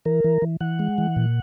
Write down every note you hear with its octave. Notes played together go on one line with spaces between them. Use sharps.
E3 A#4
E3
E3
E3 F#5
G#3
E3
A#2